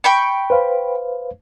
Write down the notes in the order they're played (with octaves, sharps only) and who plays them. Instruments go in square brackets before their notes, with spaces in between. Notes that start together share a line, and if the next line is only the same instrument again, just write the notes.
[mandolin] G5 B5 C#6
[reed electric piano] B4 C5 F5